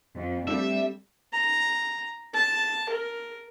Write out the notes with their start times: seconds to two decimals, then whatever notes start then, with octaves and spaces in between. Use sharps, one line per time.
0.16 F2
0.48 G3 A3 C4 D4 E5
1.33 A#5
2.34 A5
2.89 A#4